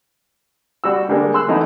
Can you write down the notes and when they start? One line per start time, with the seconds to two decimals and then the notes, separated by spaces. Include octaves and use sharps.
0.84 G3 F#4 E6
1.09 D3 G3 G#3 A#3
1.34 C6 E6 F#6
1.48 E3 F#3 A3 D#4 E4 D#5